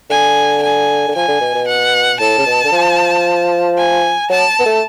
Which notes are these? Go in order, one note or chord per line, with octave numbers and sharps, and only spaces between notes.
D3 G#5
G#5
D3
F3 G#5
D3
B2
B2
F#5
A2 A5
C#3
B2
D3
F3
G#5
F#3 A5
B3
A3